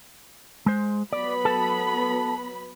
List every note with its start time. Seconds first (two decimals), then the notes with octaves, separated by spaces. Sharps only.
0.66 G#3 C5
1.13 F#3 B3 D5 B5
1.45 A4 A5